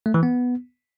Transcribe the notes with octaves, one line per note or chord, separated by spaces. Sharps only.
A3
E3
B3